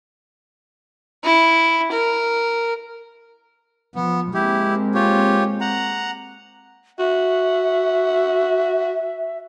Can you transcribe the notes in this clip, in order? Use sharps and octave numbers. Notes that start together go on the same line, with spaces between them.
E4
A#4
F3 B3
G#3 A#3 C4 E4 G4
F4 G4 C#5
F#5 A#5
F#4 E5